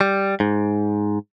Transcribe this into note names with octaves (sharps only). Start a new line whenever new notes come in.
G3
G#2